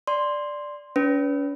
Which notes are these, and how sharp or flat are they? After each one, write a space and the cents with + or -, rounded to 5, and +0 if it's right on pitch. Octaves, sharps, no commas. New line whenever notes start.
D5 +0 C6 +0
C#4 +40 B4 +0